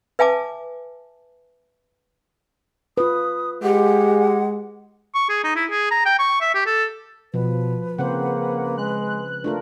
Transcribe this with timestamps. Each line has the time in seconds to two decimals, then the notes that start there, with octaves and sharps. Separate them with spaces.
0.19 B4 E5 G#5 A5 D6
2.97 F4 B4 D#6
3.63 G#3 G4 F#5
5.15 C#6
5.30 G#4
5.44 D#4
5.56 E4
5.70 G#4
5.91 A#5
6.06 G5
6.19 C#6
6.41 E5
6.55 G4
6.66 A4
7.34 B2 F3 B4
7.98 C#3 A#3 C4 C5 F#5
8.78 G#3 F#6
9.44 A3 D4 F4 A#4